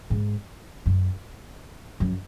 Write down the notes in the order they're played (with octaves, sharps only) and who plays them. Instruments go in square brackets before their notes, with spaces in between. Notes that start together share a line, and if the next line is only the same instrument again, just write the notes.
[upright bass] G#2
F#2
F#2